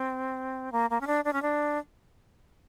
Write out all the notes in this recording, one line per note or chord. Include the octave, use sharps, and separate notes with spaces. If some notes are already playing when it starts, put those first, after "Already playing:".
Already playing: C4
A#3
A#3
C#4
D4
D4
C#4
D4